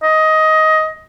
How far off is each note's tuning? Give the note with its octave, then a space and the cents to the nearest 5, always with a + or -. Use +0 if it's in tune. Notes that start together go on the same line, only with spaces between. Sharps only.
D#5 +15